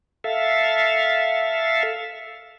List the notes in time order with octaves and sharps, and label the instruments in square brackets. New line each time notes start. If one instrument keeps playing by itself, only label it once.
[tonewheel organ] A4 E5 F5